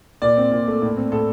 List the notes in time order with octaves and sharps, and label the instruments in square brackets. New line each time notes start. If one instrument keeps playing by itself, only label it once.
[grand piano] A#2 D5
C4
A#2
A3
A2
C4
A2 A4